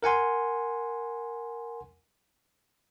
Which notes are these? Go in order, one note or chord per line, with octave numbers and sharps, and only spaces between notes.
A#4 F#5 G#5 C6